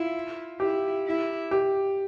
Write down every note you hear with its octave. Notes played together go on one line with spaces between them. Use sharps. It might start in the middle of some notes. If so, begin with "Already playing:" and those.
Already playing: E4 F4
E4 G4
E4
G4